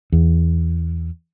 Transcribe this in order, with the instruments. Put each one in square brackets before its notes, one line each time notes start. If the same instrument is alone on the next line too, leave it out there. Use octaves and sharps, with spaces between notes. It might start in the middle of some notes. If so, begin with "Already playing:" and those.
[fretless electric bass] E2